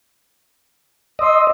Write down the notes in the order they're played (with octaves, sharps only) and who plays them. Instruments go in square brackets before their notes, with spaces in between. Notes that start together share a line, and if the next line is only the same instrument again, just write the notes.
[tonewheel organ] D#5 [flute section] C6 E6